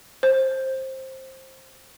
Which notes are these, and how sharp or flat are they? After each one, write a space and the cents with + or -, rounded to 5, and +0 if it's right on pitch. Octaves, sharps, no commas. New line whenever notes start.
C5 +15